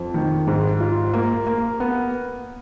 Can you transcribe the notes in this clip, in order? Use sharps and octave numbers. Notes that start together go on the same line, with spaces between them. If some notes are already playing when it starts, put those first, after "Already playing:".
Already playing: F2
D#3
G#2
F4
A#3
A#3
B3